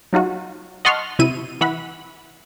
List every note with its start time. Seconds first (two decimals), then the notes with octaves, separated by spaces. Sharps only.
0.13 F#3 D#4 F4 F#4
0.85 D#5 F#5 A5 C6 C#6 F6
1.19 C3 E4 E5 D#7
1.61 E3 E5 F#5 B5